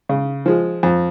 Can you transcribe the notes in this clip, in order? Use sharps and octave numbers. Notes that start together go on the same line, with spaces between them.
C#3
F3 G#3
F2